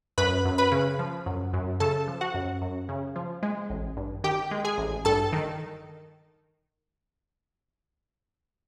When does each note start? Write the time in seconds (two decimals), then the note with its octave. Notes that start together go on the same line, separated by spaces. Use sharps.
0.18 F#2 B4 B5
0.45 F#2
0.58 B4 B5
0.72 C#3
0.99 F3
1.26 F#2
1.53 F#2
1.80 C#3 A4 A5
2.08 F3
2.21 F#4 F#5
2.34 F#2
2.62 F#2
2.89 C#3
3.16 F3
3.43 G#3
3.70 A1
3.97 G2
4.24 D#3 G4 G5
4.51 G#3
4.64 G#4 G#5
4.78 A1
5.05 G2 A4 A5
5.33 D#3